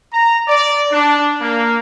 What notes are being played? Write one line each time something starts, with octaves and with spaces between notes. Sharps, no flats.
A#5
D5
D4
A#3